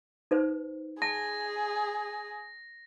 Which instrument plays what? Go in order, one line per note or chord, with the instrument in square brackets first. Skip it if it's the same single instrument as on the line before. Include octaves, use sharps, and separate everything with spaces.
[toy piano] D#4 B4 C5
[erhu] G#4 [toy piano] A5 [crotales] A#6